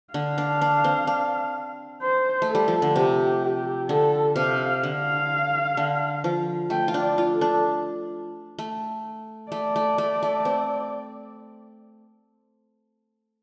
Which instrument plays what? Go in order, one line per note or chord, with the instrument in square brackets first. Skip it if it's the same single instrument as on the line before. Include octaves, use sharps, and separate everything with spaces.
[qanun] D3 [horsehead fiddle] F5
[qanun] D4
D4
C4
D4
[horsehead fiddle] C5
[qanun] A3
[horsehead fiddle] A4
[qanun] G3
F3
D3
[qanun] C3 [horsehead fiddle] G4
[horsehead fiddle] G4
[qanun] D3 [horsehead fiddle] A4
[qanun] C3 [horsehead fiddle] F5
[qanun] D3 [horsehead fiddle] F5
[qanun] D3
F3
[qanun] A3 [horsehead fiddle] G5
[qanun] F4
D4
[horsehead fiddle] D5
[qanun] F4
[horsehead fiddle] A4
[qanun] D4
A3
[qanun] A3 [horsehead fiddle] D5
[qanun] A3
A3
A3
C4